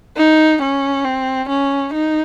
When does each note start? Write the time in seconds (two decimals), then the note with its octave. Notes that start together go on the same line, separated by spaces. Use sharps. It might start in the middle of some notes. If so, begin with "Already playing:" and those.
0.17 D#4
0.61 C#4
1.04 C4
1.49 C#4
1.93 D#4